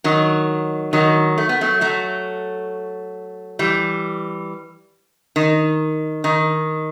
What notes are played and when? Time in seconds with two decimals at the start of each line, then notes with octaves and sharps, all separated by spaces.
0.04 D#3 F#3
0.93 D#3 F#3
1.38 A3
1.49 B3
1.61 F#3 A3
1.81 F#3 A3
3.59 E3 G3
5.36 D#3
6.24 D#3